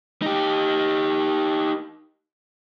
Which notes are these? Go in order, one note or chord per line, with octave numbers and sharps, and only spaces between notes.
D#4 G4